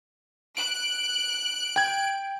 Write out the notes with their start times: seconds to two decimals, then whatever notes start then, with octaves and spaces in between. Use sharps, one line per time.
0.57 F#6 D7
1.76 G5 G#6